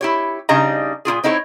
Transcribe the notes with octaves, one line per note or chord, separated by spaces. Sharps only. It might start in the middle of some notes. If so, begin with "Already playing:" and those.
E4 G4 C#5
C#3 G3 D4 D#4 D#5 A#5
A#2 E4 F4 G#4
C4 D#4 E4 G4 C#5